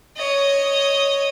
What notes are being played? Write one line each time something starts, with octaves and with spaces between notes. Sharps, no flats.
C#5 D#5